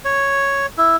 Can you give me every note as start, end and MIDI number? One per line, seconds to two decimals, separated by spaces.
0.05 0.66 73
0.78 0.96 64